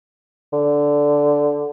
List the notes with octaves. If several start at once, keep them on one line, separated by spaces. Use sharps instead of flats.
D3